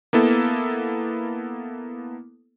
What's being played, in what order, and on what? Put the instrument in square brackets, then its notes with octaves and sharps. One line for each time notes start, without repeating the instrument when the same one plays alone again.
[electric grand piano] A#3 B3 E4 A4